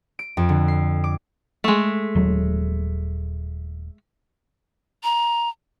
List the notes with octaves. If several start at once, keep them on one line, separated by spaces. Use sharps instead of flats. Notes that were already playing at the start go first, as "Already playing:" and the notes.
D7
F2
D3
C7
D6
G#3 A3
D#1 F#3
A#5